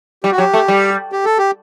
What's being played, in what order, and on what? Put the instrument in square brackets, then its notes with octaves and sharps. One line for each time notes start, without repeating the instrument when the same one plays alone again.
[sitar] G3 [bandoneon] G4
[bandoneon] F#4
[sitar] F#3 [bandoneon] G4
[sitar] A3
G3
[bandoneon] G4
A4
G4